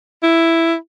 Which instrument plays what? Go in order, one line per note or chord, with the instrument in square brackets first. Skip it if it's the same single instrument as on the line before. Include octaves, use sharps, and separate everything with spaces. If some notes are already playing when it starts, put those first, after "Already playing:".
[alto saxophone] E4